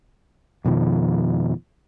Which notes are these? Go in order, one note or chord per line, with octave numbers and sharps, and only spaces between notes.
F2 B2 D#3 F3